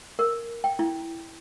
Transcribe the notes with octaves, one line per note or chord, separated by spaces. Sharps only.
A#4
G5
E4